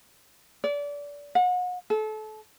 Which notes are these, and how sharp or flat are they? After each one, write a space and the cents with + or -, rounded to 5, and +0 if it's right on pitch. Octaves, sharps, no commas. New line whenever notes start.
D5 -25
F#5 -35
A4 -30